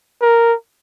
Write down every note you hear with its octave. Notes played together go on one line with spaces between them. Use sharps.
A#4